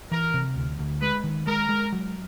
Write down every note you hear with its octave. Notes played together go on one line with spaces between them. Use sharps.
E3 A#4
C3
D2
D2
G#3 B4
D#3
G#3 A#4
G#3
F#3